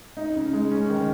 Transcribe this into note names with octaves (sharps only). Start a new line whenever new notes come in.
D#4
C#3
G#3
C#4
D#3